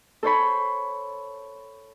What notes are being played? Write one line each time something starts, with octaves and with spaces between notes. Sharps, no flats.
A4 C5 C#5 B5